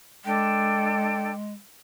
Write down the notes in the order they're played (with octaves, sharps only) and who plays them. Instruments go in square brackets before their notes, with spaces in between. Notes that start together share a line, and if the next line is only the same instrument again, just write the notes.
[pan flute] G#3 [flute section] D4 A4 G5